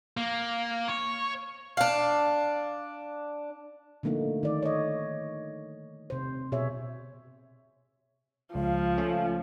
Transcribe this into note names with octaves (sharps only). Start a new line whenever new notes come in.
A#3
C#5
D4 F5
D3 F3 A3 A#3 D#4
D#3 D5
C#5 D#5
C3 C5
B2 G#4 C#5 E5
C#2 F3 F5
A3 C#4